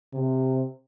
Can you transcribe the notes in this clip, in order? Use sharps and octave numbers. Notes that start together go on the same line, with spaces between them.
C3